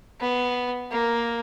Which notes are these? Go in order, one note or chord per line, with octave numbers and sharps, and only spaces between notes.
B3
A#3